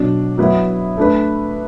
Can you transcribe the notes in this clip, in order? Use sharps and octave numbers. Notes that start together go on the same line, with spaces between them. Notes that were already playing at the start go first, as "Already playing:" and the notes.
Already playing: B2 F#3 D4
F#3 B3 E4
A3 D4 B4